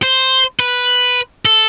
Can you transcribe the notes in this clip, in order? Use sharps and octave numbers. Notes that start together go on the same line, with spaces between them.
C5
B4
A4